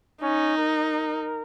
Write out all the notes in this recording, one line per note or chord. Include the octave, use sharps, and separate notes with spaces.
C#4 D#4
A#4